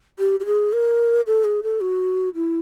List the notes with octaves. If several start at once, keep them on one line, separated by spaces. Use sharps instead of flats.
G4
G4
G#4
A#4
A4
G#4
A4
F#4
E4